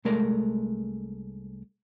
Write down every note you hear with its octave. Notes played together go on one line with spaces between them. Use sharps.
C2 G#3 A3 A#4 D5